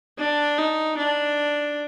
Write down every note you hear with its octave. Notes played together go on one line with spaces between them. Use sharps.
D4
D#4
D4